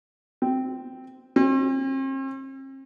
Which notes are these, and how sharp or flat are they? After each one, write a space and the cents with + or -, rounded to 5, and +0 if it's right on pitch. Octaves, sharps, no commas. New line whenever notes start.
C4 -10
C4 +45